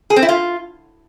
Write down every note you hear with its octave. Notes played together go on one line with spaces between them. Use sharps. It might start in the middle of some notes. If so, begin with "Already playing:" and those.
G#4
C4
E4
F4